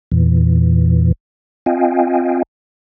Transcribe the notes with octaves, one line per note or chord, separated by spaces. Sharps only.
E2 A#2 E3
C4 F4 D#5 F5 G5 G#5